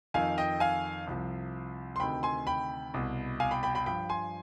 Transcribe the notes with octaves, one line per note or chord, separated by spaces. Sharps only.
F2 D#3 F5 G#5
D#5 G5
F5 G#5
C2 C3 F3
C6
D2 C3 D#3 G5 B5
G#5 C6
G5 B5
C2 B2
F5 G#5
G5 B5
G5 B5
G5 B5
G2 F3 G5 B5
G#5 C6